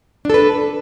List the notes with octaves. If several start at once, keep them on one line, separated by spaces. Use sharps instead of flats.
D4 A4 B4